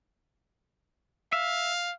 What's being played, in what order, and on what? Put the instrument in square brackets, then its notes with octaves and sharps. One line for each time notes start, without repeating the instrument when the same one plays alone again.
[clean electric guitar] E5 [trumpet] F5